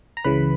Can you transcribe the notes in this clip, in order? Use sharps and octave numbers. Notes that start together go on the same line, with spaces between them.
A#5
C#2 C#3 E3 B4 B5